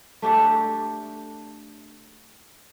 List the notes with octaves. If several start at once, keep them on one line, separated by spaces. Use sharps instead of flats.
A3 D4 G4 A4